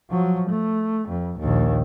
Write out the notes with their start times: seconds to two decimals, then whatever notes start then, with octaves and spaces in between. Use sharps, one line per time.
0.10 F3 F#3
0.50 A3
1.09 F2
1.39 A#1 D#2